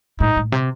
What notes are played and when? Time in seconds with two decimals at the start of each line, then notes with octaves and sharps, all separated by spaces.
0.20 A2 D#4
0.37 A2
0.52 C3